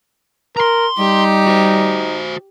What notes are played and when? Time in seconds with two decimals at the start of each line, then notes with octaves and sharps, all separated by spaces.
0.57 A#4 A#5 C6
0.99 G3 D#4 G4
1.46 F#4 C5